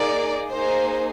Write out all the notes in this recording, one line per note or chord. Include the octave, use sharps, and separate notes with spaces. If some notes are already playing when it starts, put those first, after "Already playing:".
Already playing: A#3 D#4 G#4 D5
A#3 D#4 G#4 C5